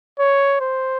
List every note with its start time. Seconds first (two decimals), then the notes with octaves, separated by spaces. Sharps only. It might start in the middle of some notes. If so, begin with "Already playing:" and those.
0.19 C#5
0.61 C5